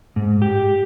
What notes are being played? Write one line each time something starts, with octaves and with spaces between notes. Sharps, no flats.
G#2
G4